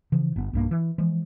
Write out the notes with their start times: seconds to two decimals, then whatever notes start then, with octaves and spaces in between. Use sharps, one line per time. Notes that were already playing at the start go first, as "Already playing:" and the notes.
0.12 C#3 E3 F3
0.36 G1 B3
0.53 B1 G2 A#3
0.71 E3
0.98 E3 F3 G#3